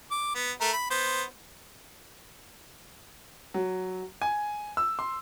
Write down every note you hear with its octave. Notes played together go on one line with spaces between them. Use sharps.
D6
B3
A3 A#4
B5
B3 C5
F#3
G#5
E6
C6